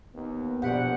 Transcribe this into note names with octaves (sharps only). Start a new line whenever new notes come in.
D#2 B3
A#1 B2 G4 B4 D5 F#5